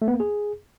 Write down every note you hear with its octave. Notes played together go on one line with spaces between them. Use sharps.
A3
B3
A#3
G#4